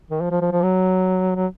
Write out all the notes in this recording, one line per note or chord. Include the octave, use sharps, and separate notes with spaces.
D#3
F3
F3
F3
F3
F#3
F#3